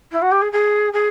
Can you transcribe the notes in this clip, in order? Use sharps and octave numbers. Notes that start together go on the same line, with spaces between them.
E4
F#4
G4
G#4
G#4
G#4